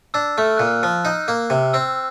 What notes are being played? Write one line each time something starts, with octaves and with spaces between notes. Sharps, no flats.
D4 E6
A3 F6
A#2 F#6
F6
F3 E6
D#4
A#3
C3
C4 E6